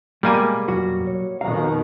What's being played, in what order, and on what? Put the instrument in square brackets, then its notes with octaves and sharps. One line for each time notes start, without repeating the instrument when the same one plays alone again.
[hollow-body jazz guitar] B2 G#3 [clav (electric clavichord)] G3 A#3 G#5
[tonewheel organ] F2 B2 [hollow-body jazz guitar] F#3 F#4
[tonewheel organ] C#5
[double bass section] F2 B2 D#3 [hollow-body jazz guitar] F5 [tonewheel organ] A#5